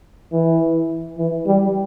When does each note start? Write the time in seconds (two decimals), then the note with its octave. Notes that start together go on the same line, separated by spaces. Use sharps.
0.33 E3
1.18 E3
1.47 G3